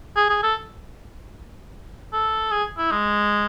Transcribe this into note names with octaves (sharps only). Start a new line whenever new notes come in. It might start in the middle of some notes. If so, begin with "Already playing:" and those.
G#4
G#4
A4
A4
G#4
E4
G#3